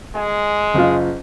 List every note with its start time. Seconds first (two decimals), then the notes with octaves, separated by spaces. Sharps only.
0.15 G#3 G#5
0.74 F#1 F4